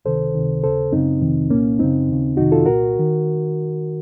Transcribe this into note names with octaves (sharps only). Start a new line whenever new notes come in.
C#2 C3 D#3 A4 C5
C#2 C3 D#3
D#2 C#3 A4 C5
F#2 C#3 C4 D#4
F2 C3 D#3
C2 A#2 A#3 C#4
F#2 C#3 C4 D#4
D#2 C#3
F2 C3 D#3 D#4 F#4
F4 A4
C2 A#2 F#4 A#4
D#3